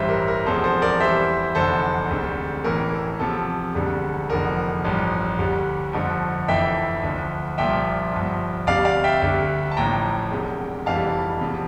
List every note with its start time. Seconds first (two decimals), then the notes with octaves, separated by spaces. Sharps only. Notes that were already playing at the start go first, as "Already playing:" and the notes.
Already playing: A1 G2 E3 G3 C5 E5
0.09 A#4
0.28 A#4
0.46 E1 E2 C3 F3 A4 C5
0.64 A4 C5
0.82 A#4 D5
1.00 E2 E3 G3 C5 E5
1.55 F1 E2 D3 A4 C5
2.10 E1 D2 C3
2.64 A1 A2 E3 A#4
2.92 A4
3.19 E2 C3 F3 A4
3.74 E1 D2 D3 G3
4.29 F1 E2 D3 F3 A#4
4.85 A1 G2 F3
5.38 D2 D3 G3
5.93 G1 F2 D3 F3
6.48 F1 F2 E3 E5 G5
7.03 D2 D3 F3
7.58 C2 A#2 F3 E5 G5
8.12 G1 G2 F3
8.67 D2 C3 G3 D5 F5
8.85 D5 F5
9.04 E5 G5
9.22 D2 D3 G3
9.71 A5
9.76 A1 A2 F3 G5 A#5
10.31 E1 E2 C3
10.86 F1 F2 E3 G3 F5 A5
11.41 E2 C3 F3